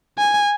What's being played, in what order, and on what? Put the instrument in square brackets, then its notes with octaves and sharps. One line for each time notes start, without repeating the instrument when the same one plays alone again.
[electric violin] G#5